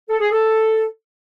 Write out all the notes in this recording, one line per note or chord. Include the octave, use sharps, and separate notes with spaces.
A4
G#4
A4